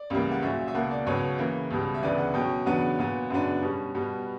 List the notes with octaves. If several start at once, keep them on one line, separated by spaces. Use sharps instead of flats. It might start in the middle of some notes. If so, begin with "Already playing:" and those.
Already playing: D5
C#2 C#3 E3 G3 A#3
F#5
A#2 F#3 C#4 E5
E5
C#2 B2 A#3 F#5
D5
C#2 B2 F#3 B3 C#5
C#3 E3 A#3
C#2 B2 G3
E5
D2 C#3 E3 B3 D5
F#5
B2 F#3 C#4 G5
E2 C#3 F#3 B3 D4 F#5
A#2 F#3 B3
F#2 C#3 F#3 B3 D4
B2 G3 C#4
B2 G3 B3